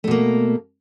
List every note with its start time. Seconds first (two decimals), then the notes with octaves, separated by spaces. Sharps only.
0.04 A3
0.07 B2
0.11 A#3